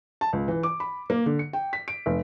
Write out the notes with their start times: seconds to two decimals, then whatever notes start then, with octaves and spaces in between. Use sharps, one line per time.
0.21 A5
0.33 C#2
0.48 E3
0.63 D6
0.80 B5
1.10 A#3
1.26 D3
1.39 C#7
1.53 G5
1.73 B6
1.88 D7
2.06 F1